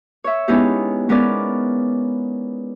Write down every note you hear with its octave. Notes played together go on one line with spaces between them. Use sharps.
C#5 E5
G#3 B3 C#4 D#4 E4 G4
G#3 B3 C#4 A#4 D5